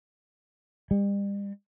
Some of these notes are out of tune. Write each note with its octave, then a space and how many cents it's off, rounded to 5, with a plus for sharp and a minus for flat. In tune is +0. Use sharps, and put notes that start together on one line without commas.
G3 +40